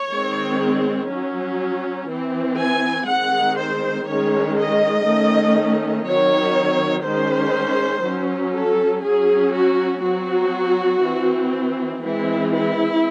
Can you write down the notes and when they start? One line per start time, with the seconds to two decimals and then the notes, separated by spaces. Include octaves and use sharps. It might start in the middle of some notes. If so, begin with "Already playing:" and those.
Already playing: C#5
0.10 D#3 G#3 C4
1.10 F#3 C#4
2.09 E3 C4
2.59 G#5
3.08 D#3 G#3 C4 F#5
3.58 C5
4.07 D#3 G#3 C#4 C#5
4.57 D#5
5.07 D#3 A3 C#4
6.06 D#3 F#3 C4 C#5
7.05 D#3 G#3 C#4 C5
8.05 F#3 C#4
8.55 A4
9.04 F#3 C#4 G#4
9.54 F#4
10.04 F#3 C4 F#4
11.03 E3 C4
12.03 E3 G#3 C4 E4
12.53 E4